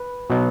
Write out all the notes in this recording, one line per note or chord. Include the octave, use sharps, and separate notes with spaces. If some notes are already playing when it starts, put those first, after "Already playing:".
Already playing: B4
B2 F#3 B3 D#4